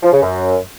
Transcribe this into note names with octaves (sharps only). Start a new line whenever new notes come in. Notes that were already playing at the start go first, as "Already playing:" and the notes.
F3
C#3
F#2